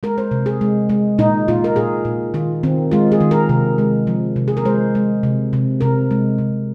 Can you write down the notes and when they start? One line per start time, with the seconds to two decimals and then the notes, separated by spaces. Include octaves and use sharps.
0.03 G#3 A#4
0.18 C5
0.31 C3
0.46 G#4
0.61 G#3
0.89 G#3
1.18 A#2 D#4
1.48 A#2 F4
1.64 A#4
1.76 A#2 G#4
2.05 A#2
2.34 D#3 F4
2.63 D#3 C4
2.91 G#3 F4
3.12 G#4
3.21 D#3
3.31 A#4
3.49 C3
3.78 G#3
4.07 F3
4.36 C3
4.48 G#4
4.57 A#4
4.65 G#3 C5
4.95 G#3
5.23 C3
5.53 C3
5.81 C3 A#4
6.11 G#3
6.38 C3